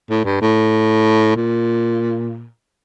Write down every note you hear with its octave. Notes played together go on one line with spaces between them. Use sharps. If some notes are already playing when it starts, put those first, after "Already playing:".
A2
G2
A2
A#2